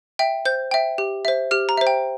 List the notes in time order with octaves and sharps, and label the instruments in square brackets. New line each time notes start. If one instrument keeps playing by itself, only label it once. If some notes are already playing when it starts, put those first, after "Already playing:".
[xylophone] E5 G5
C5 G6
E5 G5
G4
C5 E5
G4 F6
A#5
C5 E5
G5